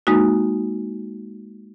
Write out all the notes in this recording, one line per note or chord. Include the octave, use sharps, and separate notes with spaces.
G#3 A#3 D#4 F#4